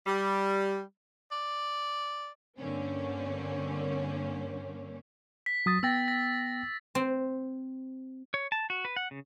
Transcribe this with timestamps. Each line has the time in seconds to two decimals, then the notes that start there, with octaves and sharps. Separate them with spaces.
0.07 G3
1.31 D5
2.58 G2 D3 A#3 C4 C#4
5.46 B6
5.66 F#3 D#6 A6
5.83 B3 G5 E6 A6 A#6
6.08 A#6
6.95 C4
8.34 C#5
8.52 A5
8.70 F#4
8.85 B4
8.96 F#5
9.11 C#3